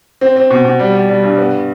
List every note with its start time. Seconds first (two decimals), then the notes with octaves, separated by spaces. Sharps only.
0.21 C4
0.36 C4
0.50 B2
0.65 B2
0.79 G3
0.94 G3
1.09 G3
1.23 G2
1.38 B3